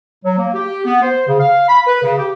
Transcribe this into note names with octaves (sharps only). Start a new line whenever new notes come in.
F#3
A#3
G4
B3
C5
C#3
F5
B5
B4
C#3
G4